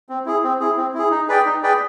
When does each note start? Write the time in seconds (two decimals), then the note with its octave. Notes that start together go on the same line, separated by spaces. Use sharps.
0.09 C4
0.26 E4 G#4
0.44 C4
0.60 E4 G#4
0.77 C4
0.94 E4 G#4
1.11 D#4
1.28 G#4 B4 D5 G5
1.45 D#4
1.63 G#4 B4 D5 G5